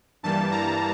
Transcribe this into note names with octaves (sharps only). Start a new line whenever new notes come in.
G2 E3 G3 A#3 A5
A#5